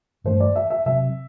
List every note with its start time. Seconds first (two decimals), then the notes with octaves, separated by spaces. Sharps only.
0.24 G2 E3 A3 D4 C5
0.40 D5
0.56 E5
0.70 E5
0.86 C3 F#3 C4 E5